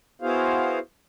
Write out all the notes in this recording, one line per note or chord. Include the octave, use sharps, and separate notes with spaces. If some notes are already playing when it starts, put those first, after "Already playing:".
B3 E4 F#4 G#4 C5 F5